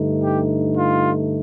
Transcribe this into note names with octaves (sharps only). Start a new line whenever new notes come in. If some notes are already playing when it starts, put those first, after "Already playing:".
Already playing: G2 D3 A3 D#4
G4
F4